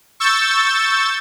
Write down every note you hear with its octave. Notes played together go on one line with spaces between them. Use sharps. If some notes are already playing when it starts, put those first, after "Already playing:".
C#6 E6 G6 A6